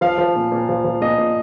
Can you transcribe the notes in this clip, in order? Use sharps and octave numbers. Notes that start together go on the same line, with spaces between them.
F3 F5
F3
A#2
A#2
F3
F3
A#2 D#5
A#2